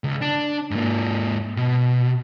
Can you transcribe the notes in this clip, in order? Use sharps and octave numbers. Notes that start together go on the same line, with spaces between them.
C#2
D4
G#2 A#3
B2